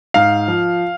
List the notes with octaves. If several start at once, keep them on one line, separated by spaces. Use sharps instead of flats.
G#2 F5
F3